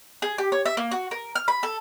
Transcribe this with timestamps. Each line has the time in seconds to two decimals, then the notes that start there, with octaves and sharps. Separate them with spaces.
0.22 G#4
0.38 G4
0.52 C#5
0.66 E5
0.77 A#3
0.91 F#4
1.11 A#4
1.36 F6
1.48 B5
1.63 A4